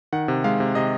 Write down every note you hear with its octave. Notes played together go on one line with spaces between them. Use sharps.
D#3 F#5
C3
G#3 F5
C3
C3 D#5